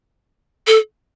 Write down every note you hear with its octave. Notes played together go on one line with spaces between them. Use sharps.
A4